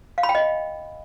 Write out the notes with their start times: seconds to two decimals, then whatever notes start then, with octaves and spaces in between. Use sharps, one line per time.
0.18 F5
0.23 B5
0.29 G5
0.35 D#5